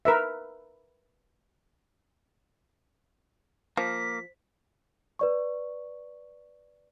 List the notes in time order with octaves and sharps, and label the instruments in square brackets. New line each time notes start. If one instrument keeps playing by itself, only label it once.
[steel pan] A#4 B4 E5
[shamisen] F3 [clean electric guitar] A#3 [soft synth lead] B6
[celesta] B4 D5 C#6